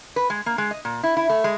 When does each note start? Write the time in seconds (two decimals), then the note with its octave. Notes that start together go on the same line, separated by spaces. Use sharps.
0.16 B4
0.30 G#3
0.46 A#3
0.58 G#3
0.71 D#5
0.85 A#2
1.03 E4
1.17 E4
1.29 A3
1.44 G#3